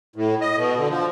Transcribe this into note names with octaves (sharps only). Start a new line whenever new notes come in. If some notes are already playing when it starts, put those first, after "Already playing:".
A2
D#5
B2
D3
F3